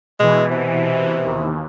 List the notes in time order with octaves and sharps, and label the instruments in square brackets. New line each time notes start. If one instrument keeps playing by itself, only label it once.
[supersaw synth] B2 E3 [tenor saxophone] G#3
[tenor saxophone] C3
[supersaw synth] D#2